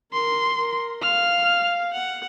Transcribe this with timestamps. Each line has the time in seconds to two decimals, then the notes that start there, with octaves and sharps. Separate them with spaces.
0.13 A#4 C6
0.58 A#4
1.03 F5 F6
1.93 F#5